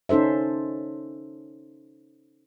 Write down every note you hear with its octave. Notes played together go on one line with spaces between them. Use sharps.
C#4 D#4 A4 C5 E5